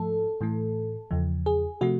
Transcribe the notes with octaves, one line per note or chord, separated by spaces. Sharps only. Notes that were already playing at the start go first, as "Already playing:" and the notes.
Already playing: G#2 F3 A3 A4
A2 E3 A3
E2 C#3 F3
G#4
C3 F3 A3 F#4